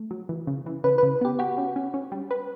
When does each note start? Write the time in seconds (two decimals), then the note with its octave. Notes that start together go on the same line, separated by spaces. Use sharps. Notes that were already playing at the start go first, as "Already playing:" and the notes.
Already playing: A3
0.11 F#3
0.29 E3
0.47 C#3
0.66 E3
0.84 C#3 B4
0.98 B4
1.03 C#3
1.21 B3 G4
1.39 F#4 G4
1.58 C#4
1.76 C#4
1.94 C#4
2.12 G3
2.31 B4